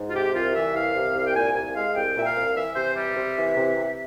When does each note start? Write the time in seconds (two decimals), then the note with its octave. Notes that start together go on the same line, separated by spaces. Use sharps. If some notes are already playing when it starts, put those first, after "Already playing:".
Already playing: G#2
0.09 F4
0.14 C3 G4
0.34 C2 F4
0.54 E3 E5
0.74 C2 F5
0.95 C3
1.15 C2 F5
1.26 G5
1.35 A#2 G#5
1.54 C2 G#5
1.74 G#3 F5
1.95 C2 G5
2.15 A#2 E5
2.25 F5
2.35 C2
2.56 E3 E5
2.75 C3 C5
2.96 G3 E5
3.16 C3
3.37 E3
3.56 C3
3.77 C3